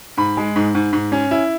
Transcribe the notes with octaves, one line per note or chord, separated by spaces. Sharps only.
G#2 B5
G#3
G#2
G#2
G#2
C#4
E4